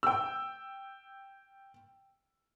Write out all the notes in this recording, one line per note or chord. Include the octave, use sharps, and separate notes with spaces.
G5 E6